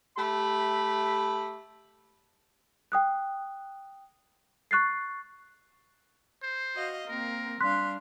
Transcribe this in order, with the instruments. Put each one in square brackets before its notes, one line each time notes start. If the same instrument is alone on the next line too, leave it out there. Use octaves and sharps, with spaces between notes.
[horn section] A3 G4 E5 B5
[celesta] G5 D#6 F#6
C#6 F#6 A6 C7
[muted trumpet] C5
[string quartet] F#4 D#5 F5
[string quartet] A#3 C4 [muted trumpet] A#4
[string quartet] G3 D4 F5 [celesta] C6 F#6 B6